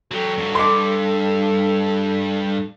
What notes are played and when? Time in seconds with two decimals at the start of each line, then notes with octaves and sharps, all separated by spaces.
0.11 F#3 G4 A4
0.38 G2 F#3
0.55 G2 C6 D6